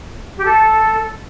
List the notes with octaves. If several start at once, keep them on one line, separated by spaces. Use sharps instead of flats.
G4
A4